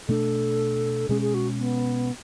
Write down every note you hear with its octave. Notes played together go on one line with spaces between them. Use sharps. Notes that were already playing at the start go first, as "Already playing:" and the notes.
B2 A3 D4 A4
B2 G#3 C#4 G#4
G#4
F#4
B3